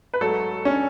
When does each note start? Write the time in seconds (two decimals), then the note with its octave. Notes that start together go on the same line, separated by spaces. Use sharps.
0.14 B4
0.21 G#2 F#3 A3 A4
0.65 C#4